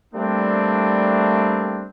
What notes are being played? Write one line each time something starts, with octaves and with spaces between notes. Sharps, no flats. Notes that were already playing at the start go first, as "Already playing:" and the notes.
G3 A3 A#3 C4 D4